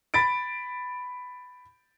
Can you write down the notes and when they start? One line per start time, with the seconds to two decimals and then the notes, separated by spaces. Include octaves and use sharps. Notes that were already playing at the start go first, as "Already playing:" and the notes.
0.14 B5 A6 D7